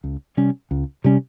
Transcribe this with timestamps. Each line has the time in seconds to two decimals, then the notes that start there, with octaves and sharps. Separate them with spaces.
0.04 C#2
0.37 C3 G3 C#4
0.71 C#2
1.04 C3 G3 C#4